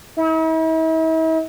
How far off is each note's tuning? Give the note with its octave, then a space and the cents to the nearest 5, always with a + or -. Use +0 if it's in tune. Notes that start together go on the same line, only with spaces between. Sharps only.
E4 -45